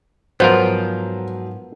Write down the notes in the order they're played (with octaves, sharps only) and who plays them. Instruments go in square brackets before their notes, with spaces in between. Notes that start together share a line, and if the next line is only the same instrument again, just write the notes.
[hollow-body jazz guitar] G#2 [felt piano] F3 F#3 [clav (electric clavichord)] B3 F4 A#4 [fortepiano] C5